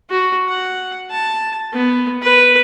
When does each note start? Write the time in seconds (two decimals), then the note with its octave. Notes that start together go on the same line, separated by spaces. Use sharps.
0.10 F#4
0.49 F#5
1.11 A5
1.73 B3
2.22 B4